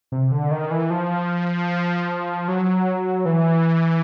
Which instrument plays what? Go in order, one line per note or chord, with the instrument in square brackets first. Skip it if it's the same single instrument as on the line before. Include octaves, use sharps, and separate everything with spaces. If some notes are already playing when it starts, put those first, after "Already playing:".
[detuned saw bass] C3
D3
D#3
E3
F3
F#3
E3